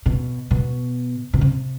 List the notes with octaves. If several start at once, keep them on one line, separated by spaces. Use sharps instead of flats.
B2
B2
B2
C3